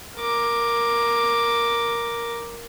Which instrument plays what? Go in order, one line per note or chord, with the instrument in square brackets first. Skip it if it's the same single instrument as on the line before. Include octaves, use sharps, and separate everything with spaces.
[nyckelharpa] A#4 D6